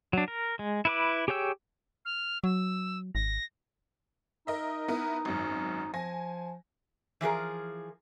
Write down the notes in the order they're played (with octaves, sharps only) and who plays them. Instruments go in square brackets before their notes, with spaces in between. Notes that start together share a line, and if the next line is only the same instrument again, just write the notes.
[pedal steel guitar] F#3 D4
A#4
G#3
E4 B4 D6
G4 G#4 C#5 G5 E6
[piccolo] F6
[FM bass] F#3 [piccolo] E6
[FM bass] G#1 [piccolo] A#6
[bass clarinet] D#4 [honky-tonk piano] A#4 D#5 E5
[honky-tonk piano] B3 E4 A#4
G#1 F#2
[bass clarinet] F3 [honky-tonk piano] G#5 A#6
[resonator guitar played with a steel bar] E3 F3 G#4 A#4